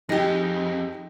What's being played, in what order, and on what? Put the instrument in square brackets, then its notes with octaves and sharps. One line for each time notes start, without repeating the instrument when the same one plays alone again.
[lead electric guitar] F2 [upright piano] D#4 A#6 [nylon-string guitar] G4 G#4